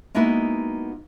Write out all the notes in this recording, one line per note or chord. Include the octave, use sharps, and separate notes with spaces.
G#3 A#3 B3 D#4 E4 F#4